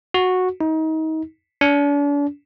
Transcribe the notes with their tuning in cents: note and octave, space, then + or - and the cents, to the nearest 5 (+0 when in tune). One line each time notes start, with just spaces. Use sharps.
F#4 -10
D#4 +30
D4 -40